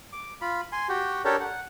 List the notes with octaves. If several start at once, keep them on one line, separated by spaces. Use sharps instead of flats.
D6
F4 B5
G#5 C6
F#4 G4
D4 G4 A4 A#4 C#5
F#5